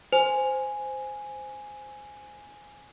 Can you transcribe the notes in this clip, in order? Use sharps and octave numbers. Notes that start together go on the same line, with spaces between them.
C5 G#5